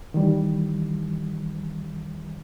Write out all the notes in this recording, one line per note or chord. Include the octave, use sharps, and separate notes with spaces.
D#3 E3 G3